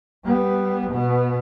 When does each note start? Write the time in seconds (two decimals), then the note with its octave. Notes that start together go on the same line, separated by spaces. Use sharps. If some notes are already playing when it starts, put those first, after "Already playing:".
0.25 G3 B3
0.91 B2 B3